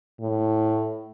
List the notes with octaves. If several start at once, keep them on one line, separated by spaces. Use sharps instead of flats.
A2